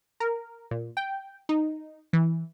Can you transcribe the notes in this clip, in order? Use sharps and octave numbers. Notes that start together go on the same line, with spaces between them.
A#4
A#2
G5
D#4
E3